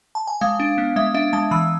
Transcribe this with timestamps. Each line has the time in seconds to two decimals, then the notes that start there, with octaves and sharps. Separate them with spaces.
0.15 A5
0.27 G#5
0.41 G#3 F5
0.60 D4
0.78 B3
0.96 G#3 E5
1.14 D4 E5
1.33 G#3 A5
1.51 E3 B5